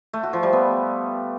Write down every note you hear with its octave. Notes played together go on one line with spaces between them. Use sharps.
A3
F#4
F3
G3
B3